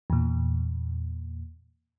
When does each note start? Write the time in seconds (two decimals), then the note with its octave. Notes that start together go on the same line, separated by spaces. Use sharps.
0.10 E2 A#2